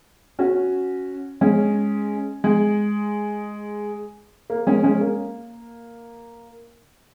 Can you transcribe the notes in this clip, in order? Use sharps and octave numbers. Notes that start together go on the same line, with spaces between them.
C#4 F#4
G#3 C#4
G#3
A#3
G#3 C#4
G#3 C#4
A#3